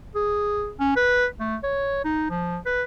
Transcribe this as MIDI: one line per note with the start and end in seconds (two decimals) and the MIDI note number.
0.15 0.71 68
0.80 0.92 61
0.96 1.26 71
1.40 1.56 57
1.64 2.02 73
2.04 2.27 63
2.30 2.58 53
2.66 2.83 71